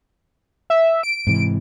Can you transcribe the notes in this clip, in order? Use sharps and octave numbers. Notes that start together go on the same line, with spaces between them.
E5
D7
G#2 C3 E3